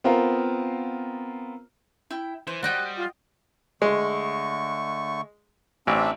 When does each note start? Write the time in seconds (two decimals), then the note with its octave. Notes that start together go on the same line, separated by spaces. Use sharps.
0.04 B3 C4 F4 A#4 F5 A#5
2.10 E4 G5
2.47 E3 C5
2.63 G3 F#4 D#5 G5 F#6
2.97 F4
3.82 D3 G#3 A3 C#6
5.87 A1 C4 D4 E5